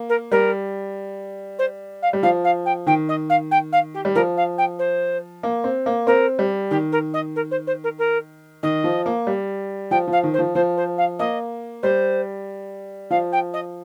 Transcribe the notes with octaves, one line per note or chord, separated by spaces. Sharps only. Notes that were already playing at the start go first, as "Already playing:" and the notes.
Already playing: A#3
A#4
G3 A#4
C5
F5
G3
F3 F5
F5
G5
D#3 G5
D#5
F5
G5
F5
G4
G3
F3 A#4
F5
G5
C5
A#3
C4
A#3
C4 A#4
G3
D#3 G4
A#4
D#5
A#4
C5
C5
A#4
A#4
D#3 D#5
F3
A#3
G3
F3 G5
F3 F5
D#3
C5
F3
F3 C5
C5
F5
A#3 D#5
G3 C5
F3 F5
G5
D#5